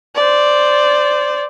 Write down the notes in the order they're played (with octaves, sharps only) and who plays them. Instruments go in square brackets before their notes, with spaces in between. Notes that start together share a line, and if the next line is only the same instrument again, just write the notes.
[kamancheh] C5 D5